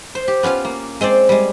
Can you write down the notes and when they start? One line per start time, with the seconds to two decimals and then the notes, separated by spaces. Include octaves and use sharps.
0.15 C5
0.28 G4
0.43 B3 C#4 F4 F5
0.65 A#3
1.01 G#3 C4 C5 D5
1.29 G3 G#3